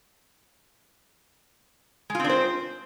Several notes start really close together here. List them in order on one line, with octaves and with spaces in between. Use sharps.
G#3 F4 C4 D4 C5